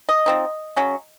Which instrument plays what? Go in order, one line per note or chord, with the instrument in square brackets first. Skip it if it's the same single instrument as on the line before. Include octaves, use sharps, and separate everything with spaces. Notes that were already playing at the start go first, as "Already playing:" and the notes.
[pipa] D#5
F3 C4 D#4
C#3 F#3 C#4